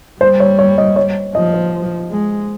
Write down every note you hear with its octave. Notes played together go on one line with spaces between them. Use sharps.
G3 C5
C#5
C#5
D#5
C#5
F3 D#5
C5
G#3